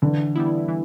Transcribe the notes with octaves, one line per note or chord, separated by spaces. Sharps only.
D3 E3
G3 B3 E4
E3